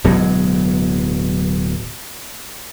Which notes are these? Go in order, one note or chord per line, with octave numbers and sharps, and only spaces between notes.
D1 B2 F#3 G#3